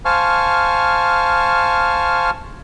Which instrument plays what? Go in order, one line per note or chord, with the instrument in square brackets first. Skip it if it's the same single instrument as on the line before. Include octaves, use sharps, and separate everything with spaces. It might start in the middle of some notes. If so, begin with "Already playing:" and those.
[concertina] C5 F5 G#5 A5 C#6 F6